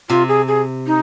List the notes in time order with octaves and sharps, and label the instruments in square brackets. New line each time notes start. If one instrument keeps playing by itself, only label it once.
[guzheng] C3 [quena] F4
[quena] G#4
G#4
D#4